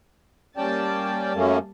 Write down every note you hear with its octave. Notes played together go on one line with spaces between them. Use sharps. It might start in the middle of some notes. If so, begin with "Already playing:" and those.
G3 A#3 C#4 D5 G5 A5
F#2 A3 A#3 C#4